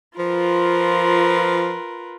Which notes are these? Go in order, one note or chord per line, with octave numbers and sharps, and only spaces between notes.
F3 F4 A#4 B4